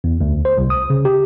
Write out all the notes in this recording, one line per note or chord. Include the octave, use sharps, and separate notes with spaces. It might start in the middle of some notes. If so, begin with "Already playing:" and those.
E2
D2
C5
C2
D#6
C#3
G4